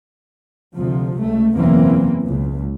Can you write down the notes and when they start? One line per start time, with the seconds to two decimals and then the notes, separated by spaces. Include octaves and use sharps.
0.76 D2 C3 F3
1.18 C#2 A3
1.55 F#1 E2 B2 E3 A#3 C4
2.23 C#2